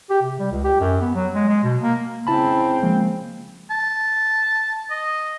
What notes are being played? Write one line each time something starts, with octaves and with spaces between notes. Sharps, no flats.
G4
C3
G3
C#2
G4
F#2
B3
F#3
G#3
G#3
B2
A#3
C#3 C4 E4 A5 B5
F3 G#3 A#3
A5
D#5